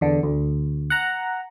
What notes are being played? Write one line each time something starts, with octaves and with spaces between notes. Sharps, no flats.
E2 D3
D2
F#5 A#5